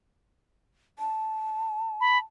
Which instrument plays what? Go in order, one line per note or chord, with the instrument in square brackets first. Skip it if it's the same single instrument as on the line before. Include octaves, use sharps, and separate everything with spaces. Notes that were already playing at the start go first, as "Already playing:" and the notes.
[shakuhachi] A5
[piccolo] B5